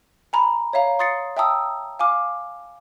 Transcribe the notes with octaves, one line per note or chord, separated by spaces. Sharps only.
G#5 A#5 B5
C#5 E5 F5 A#5
C6 D#6 A6 C7 C#7
E5 G5 A5 A#5 D#6 E6
F5 G#5 D6 F6